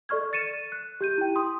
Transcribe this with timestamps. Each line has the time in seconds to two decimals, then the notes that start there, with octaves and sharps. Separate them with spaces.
0.09 A4 D5 C#6 F6 G#6
0.33 A6 C#7 D#7 E7
0.72 F#6
1.01 G4 G6 D#7
1.18 E4 G5
1.36 C6 D#6